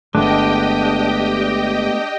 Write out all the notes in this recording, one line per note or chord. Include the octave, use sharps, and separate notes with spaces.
G1 G#3 A3 B3 D4 G4 D#5 G5